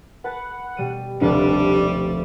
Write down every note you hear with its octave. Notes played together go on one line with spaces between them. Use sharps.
B4 F#5 A5
B2 G3 D#7
F1 D2 G3 D4